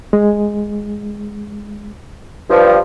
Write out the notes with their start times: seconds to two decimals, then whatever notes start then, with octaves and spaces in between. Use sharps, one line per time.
0.13 G#3
2.50 G2 F3